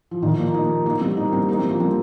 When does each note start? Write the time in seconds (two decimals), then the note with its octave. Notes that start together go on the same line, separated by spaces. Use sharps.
0.11 F3
0.22 A#2 D#3
0.38 F3 A#3
0.54 A#3 D#4
0.86 A#3 D#4
1.01 G3 C4
1.17 A#3 D#4
1.32 G3 C4
1.49 A#3 D#4
1.59 G3 C4
1.70 F3 A#3
1.80 G3 C4